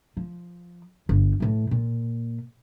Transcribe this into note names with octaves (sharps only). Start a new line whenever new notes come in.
F3
G1
A2 E3
A#2